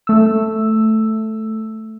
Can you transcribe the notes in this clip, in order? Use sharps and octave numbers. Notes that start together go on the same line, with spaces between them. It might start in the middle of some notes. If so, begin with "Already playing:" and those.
A3 E6